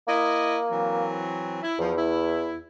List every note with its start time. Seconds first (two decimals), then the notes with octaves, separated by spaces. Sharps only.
0.08 A#3 E4 D#5
0.70 E3 F#3 C4
1.62 E4
1.79 E2 F3
1.96 E4